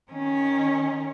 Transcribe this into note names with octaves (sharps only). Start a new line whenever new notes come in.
D#3 C#4